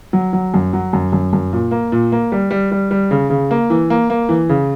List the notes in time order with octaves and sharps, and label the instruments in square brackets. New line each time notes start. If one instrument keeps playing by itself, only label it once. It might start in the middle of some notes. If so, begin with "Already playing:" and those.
[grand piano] F#3
F#3
F#2
F#3
F#2
F#2
F#2
A#2
A#3
A#2
A#3
G3
G3
G3
G3
C#3
C#3
A#3
E3
A#3
A#3
E3
C#3